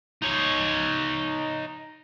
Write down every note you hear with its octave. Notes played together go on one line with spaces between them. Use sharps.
D#4 C#5